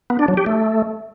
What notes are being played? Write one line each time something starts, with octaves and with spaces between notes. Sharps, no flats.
B3
D4
F#3
G4
A3